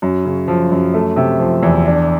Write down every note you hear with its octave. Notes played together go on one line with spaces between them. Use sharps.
F#2
C#3
F3
F#2
A3
C3
F3
E2
D4